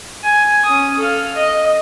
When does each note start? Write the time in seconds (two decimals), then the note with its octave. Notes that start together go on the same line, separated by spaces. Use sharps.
0.23 G#5
0.65 C#4 D#6
0.98 A4 F5
1.35 D#5